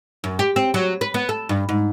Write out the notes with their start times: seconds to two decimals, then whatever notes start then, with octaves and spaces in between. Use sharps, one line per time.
0.24 F#2
0.39 G4
0.56 C4
0.74 F#3
1.01 B4
1.14 B3
1.29 A4
1.49 G2
1.69 G#2